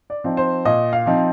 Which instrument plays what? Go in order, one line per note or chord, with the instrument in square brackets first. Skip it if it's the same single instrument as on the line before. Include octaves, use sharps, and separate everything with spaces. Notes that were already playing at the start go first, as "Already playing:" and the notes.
[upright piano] D5
F3 C4 D#4
C5
A#2 D#5
F5
F3 C4 D#4